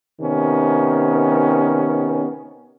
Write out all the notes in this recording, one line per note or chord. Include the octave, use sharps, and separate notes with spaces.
C3 D#3 B3 C#4